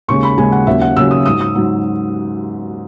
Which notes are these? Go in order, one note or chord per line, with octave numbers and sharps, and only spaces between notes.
D#2 C#3 G#3 C#6
B5
D#2 C#3 G#3 G#5
F#5
D#2 C#3 F#3 E5
F#5
D#2 C#3 F#3 E6
D#6
G#2 F#3 D#6
D#6
G#2 F#3